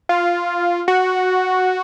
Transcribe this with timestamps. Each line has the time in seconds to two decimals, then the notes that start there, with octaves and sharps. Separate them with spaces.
0.09 F4
0.88 F#4